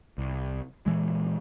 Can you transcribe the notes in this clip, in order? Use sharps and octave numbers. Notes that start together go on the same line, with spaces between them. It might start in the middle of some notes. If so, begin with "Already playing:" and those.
C2
A#2 E3 G#3